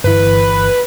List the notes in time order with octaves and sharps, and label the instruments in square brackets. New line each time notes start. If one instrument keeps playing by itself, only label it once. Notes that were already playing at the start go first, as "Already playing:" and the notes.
[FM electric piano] G1 E3 [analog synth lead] B4